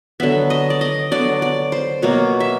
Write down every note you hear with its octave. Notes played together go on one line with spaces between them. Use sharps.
D3 F#3 B3 E5
D#5
D5
D#5
D3 F#3 B3 D5
D5
C5
B2 F#3 A#3 C#5
E5